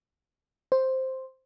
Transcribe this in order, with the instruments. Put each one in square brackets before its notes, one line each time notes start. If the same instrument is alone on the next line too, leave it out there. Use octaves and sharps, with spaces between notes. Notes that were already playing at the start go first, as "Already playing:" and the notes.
[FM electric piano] C5